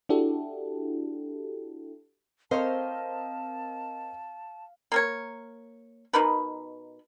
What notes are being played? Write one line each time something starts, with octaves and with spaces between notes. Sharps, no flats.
D4 E4 F#4 G4 A4
C4 A#4 C5 C#5 D#5 F5 A5
A#3 A#4 C#5
B2 D#4 A#4 B4